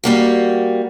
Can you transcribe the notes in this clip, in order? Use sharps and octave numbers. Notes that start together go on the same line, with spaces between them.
G3 A#3 F#4